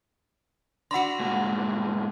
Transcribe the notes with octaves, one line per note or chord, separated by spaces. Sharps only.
D4 F#4 F#5 B5 C6
G2 A#2 G#3